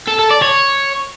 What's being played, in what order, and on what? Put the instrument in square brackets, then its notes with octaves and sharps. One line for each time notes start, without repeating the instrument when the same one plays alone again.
[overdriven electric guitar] A4
A4
D5
C#5